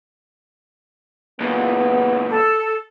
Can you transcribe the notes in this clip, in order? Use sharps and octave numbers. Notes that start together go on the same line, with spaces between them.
C#2 A#2 B3
A4